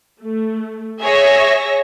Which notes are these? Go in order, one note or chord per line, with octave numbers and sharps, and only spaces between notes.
A3
G#4 C#5 E5 A#6